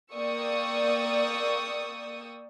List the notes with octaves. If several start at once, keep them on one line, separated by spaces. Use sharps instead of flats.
A#3 D5 G5 C#6 D#6 E6